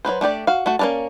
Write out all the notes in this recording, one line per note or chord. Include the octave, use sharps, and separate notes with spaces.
F#3 C#4 B4 C5
A3 D4 G4 D5
F#4 F5
A3 F#4
A#3 C#4 A#4 D5 A5